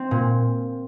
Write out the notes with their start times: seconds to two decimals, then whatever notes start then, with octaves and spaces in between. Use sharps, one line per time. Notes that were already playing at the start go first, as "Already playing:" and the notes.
Already playing: C4
0.11 A#2